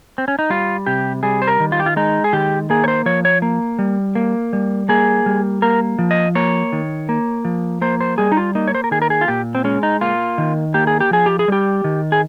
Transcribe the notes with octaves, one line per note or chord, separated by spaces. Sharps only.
C4
C#4
D#4
G3 F4
C3 G4
G3 G#4
C5
A#4
D#3
F4
G4
F4
G#3 D#4
G#4
D#3 G4
A#3 G#4
C#5
C5
F3 C#5
C#5
A#3
G3
A#3
G3
A#3 G#4
G3
A#3 A#4
F3
D#5
A#3 C#5
D#3
A#3
F3
A#3 C5
C5
G3 G#4
D#4
F4
A#3 D#4
C#5
C5
A#4
D#3 G#4
A#4
G#4
F4
A#2 G4
C4
G#3 C#4
D#4
A#3 F4
D#3
A#3 G4
G#4
G4
F3 G#4
G4
G#4
G3 G4
D#3
G#4